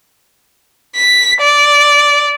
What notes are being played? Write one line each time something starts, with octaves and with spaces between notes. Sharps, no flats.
B6
D5